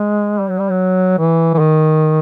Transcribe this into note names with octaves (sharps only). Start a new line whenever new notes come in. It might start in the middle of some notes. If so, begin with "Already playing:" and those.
Already playing: G#3
G3
F#3
G3
F#3
E3
E3
D#3